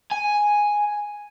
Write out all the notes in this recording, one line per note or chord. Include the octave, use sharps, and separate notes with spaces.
G#5